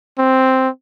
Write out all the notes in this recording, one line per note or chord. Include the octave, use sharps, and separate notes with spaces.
C4